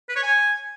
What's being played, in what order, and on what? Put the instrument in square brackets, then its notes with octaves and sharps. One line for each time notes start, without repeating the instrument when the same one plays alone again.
[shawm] B4
C#5
G#5